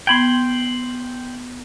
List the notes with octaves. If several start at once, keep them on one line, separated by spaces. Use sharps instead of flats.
B3 G5 B5 C6 G#6